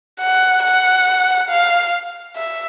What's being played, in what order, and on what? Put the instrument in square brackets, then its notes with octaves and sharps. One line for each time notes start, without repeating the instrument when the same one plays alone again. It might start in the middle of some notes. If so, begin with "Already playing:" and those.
[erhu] F#5
F#5
F5
E5